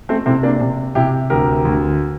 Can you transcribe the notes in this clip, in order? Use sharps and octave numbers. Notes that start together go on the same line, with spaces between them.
A3 C4
C3 C4 E4
A#3 D4
C3
C3 E4 G4
D2 G4 A#4
D2